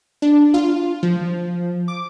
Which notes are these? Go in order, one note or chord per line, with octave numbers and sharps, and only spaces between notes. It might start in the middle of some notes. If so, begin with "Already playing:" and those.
D4
F4
F3
D6